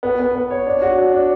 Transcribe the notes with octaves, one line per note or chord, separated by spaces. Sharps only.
B3
B3
B3
C#5
D4
F#4
D4
D4